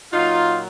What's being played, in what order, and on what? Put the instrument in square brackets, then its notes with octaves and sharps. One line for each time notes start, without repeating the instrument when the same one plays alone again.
[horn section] A#2 F#3 D#4 F4